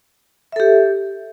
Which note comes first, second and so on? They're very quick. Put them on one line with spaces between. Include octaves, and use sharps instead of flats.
E5 A4 G4